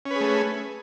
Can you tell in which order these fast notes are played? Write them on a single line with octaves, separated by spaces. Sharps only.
C#4 B4 G#4 A3